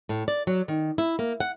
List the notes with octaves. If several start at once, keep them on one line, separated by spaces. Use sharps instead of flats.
A2
D5
F#3
D#3
E4
A#3
F#5